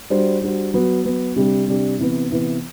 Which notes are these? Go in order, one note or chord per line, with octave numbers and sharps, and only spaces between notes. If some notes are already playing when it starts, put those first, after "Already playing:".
G3 D4 F#4 C5
G3 D4 F#4 C5
F#3 B3 F#4
F#3 B3 F#4
C3 G3 D4 G4
C3 G3 D4 G4
C3 E3 B3
C3 E3 B3